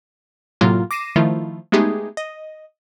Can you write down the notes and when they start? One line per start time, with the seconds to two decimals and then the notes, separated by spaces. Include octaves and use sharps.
0.61 A2 C3 F#3 A#3 F4
0.91 D6 A#6 C7 D#7 E7
1.16 D#3 F3 A3 E4 F4
1.72 G#3 A3 B3 D#4 G4 G#4
2.17 D#5